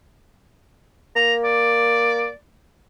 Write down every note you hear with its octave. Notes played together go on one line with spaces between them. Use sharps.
A#3 A#5
D5